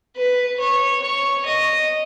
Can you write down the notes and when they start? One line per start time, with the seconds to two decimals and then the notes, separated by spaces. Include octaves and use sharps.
0.16 B4
0.60 C#5
1.02 C#5
1.46 D#5